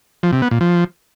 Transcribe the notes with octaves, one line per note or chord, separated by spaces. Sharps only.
F3
C3
B3
A#2
F3